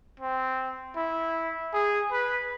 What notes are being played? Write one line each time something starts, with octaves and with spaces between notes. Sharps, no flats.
C4
E4
G#4
B4